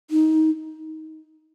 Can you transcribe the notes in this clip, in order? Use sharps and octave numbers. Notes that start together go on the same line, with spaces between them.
D#4